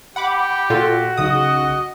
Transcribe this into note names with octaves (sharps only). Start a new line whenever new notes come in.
G4 F#5 B5 D6
A#2 F4 F#4 A4
B1 C#3 D#5 D#6